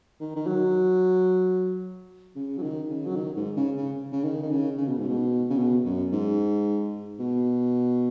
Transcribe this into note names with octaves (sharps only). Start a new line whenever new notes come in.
D#3
D#3
F#3
C#3
F#3
D#3
C#3
F#3
D#3
G#2
C#3
C#3
C#3
D#3
D#3
C#3
C#3
B2
G#2
B2
C#3
B2
F#2
G#2
B2